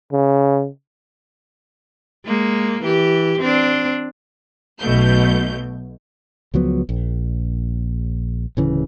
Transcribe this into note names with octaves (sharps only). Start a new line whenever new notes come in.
C#3
G#3 A#3
E3 G4
C4 D4
B1 B2 A3 G6
C#2 F3 F#3 B3
A#1
D1 C#3 E3